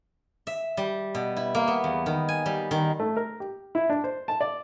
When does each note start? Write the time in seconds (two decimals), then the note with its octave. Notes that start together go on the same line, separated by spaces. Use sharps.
0.47 E5
0.77 G3
1.15 B2
1.37 E4
1.55 A#3
1.68 B3
1.84 E2
2.06 D#3
2.29 G#5
2.46 G3
2.71 D#3
3.00 A3
3.17 A#4
3.40 G4
3.75 E4
3.90 D4
4.04 C5
4.28 A5
4.41 D5